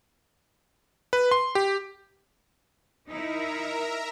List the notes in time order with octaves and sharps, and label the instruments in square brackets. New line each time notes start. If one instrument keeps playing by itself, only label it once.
[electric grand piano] B4
C6
G4
[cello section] D#4 E4 [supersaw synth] A#4 E5 A#5